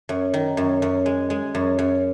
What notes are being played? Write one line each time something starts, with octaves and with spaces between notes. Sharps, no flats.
F#2
D#3
F#2
F#2
G#3
G#3
F#2
F#2